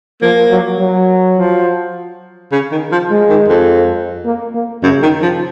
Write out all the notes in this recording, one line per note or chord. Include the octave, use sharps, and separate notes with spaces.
F3 A#3
F#3
F#3
F3
C#3
D#3
F3
G#3
D#3
F2
A#3
A#3
F#2 C#3
D#3
F3